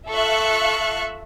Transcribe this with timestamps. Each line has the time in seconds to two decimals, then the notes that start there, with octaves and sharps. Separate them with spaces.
0.10 F4 A4 E5 F5 C#6 F#6